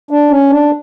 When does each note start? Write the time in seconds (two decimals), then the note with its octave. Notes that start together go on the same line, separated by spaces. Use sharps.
0.11 D4
0.30 C#4
0.50 D4